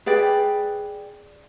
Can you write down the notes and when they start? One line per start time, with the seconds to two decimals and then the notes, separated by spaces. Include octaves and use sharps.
0.06 G#4 B4 D5 G5